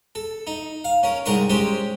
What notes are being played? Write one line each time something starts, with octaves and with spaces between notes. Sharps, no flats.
A4
D#4
F5
C#4 A#4
C2 G#2 A#4 C6 C#6 D#6
G#3 C#4 G4 C5